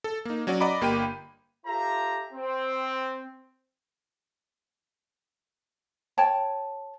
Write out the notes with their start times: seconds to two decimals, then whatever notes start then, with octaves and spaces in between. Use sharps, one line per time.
0.04 A4
0.25 A#3 D#4
0.47 F#3 C#4 F#4 D5
0.60 D5 D#5 F#5 A#5 B5 D6
0.81 G1 A#3 G4 G5 B5 D#7
1.66 F4 G4 A4 C5 E5 A#5
2.33 C4
6.18 C#5 G5 A5